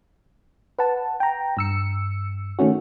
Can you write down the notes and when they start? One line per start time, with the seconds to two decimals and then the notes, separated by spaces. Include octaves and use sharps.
0.79 B4 F#5 A5
1.20 G5 A#5
1.57 G2 E6 C#7
2.59 D#3 A3 C#4 F#4